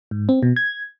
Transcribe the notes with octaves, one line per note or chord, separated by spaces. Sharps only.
G#2
C4
B2
G#6